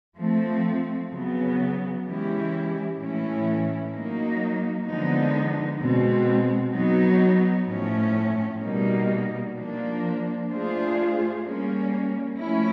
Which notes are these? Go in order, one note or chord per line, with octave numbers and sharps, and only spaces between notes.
F3 A3 C4
C#3 F#3 B3
E3 G#3 C#4 E4 G4
A2 E3 A3 C#4 E4
F#3 A#3 D#4
D3 F3 G#3 B3 D#4
B2 G#3 C4
F#3 B3 D#4
A2 F3 A3 C#4
B2 G3 A#3 D#4
F3 A#3 D4
A3 D4 F4 G#4 C5
G3 A#3 C#4
F3 A3 C#4 E4